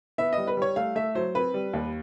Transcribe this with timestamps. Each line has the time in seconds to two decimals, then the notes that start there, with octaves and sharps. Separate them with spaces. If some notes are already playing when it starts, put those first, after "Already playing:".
0.18 B3 E5
0.33 G3 D#5
0.47 B4
0.57 G3 C#5
0.76 A3 F5
0.95 A3 E5
1.15 F#3 C5
1.35 C4 B4
1.54 G3
1.73 D#2